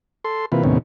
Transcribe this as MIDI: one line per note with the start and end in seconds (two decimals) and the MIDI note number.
0.24 0.46 69
0.24 0.46 84
0.52 0.63 48
0.52 0.63 52
0.52 0.63 58
0.52 0.63 65
0.52 0.63 71
0.64 0.78 39
0.64 0.78 45
0.64 0.78 48
0.64 0.78 51
0.64 0.78 59
0.64 0.78 61